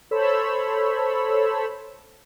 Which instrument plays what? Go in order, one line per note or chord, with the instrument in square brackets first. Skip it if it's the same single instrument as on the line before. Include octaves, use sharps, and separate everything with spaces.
[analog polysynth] A4 C5 C#5 B5 E6